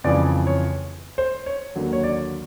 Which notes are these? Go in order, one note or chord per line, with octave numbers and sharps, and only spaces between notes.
F2 C#3 E3 G#3 D5
C#5
C5
C#5
D#2 D3 F#3
C#5
D5